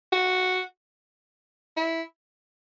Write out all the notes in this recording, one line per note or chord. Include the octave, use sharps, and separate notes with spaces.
F#4
E4